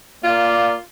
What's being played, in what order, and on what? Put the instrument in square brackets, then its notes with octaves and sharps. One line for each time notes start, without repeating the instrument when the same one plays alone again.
[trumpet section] A#3 D5 [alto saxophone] F4